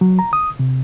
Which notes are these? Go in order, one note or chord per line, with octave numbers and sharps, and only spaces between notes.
F#3
A#5
D#6
C3